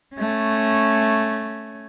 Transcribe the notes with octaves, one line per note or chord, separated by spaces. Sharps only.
A3 C#4